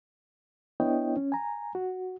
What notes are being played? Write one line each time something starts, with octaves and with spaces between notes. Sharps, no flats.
B3 D4 E4 C#5 D#5 G5
C#4
G#5 A#5
F#4